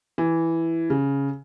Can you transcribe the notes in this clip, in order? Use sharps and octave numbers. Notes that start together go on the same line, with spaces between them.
E3
C#3